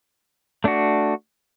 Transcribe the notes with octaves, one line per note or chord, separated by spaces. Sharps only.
A3 D4 F#4